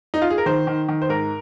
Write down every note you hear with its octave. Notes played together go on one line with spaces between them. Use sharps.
D#4
F4
G#4
A#4
D#3 C5
D#3
D#3
C5
G#2 A#4